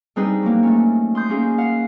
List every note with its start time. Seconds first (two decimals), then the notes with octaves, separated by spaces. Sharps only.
0.16 G3 C4 D4 D#4 G#4 B4
0.42 F#3 A#3
0.63 A3 C#4
1.15 C6 D#6 G6
1.29 A#3 C#4 G#4
1.58 F5 F#5